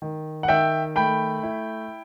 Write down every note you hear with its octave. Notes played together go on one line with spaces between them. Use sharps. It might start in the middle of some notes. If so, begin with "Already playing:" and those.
D#3
F#5
D#3 E5 G5
A3 G5 B5
E4